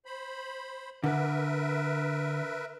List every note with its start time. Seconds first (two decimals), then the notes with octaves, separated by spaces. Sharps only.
0.05 C5 B5
1.04 D3 A#4 B4 E5